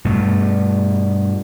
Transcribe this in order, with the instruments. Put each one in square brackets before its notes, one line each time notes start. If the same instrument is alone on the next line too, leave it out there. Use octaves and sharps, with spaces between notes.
[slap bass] G2 B2 A3